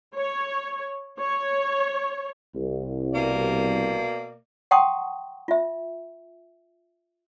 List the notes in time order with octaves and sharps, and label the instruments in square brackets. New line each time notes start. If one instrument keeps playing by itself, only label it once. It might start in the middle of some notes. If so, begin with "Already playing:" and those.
[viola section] C#5
C#5
[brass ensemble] C2
[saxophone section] B2 A#3 D5
[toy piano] F#5 G5 A5 C6 C#6 D#6
F4 E5